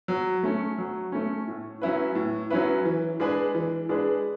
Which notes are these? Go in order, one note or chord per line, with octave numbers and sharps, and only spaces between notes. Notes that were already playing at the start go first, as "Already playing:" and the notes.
F#3
A3 C#4
F#3
A3 C#4
A2
F#3 C#4 E4 B4
A2
F#3 C#4 E4 B4
E3
G#3 D4 G#4 B4
E3
G#3 D4 G#4 B4